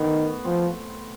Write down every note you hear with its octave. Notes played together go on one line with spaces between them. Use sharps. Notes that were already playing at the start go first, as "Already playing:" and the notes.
Already playing: D#3 A3 B3
F3 C4